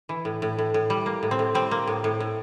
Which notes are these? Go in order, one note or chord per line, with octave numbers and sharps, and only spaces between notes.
E3
A2
A2
A2
A2
G3
A#3
A2
C4
A2
G3 C4
A#3
A2
A2
A2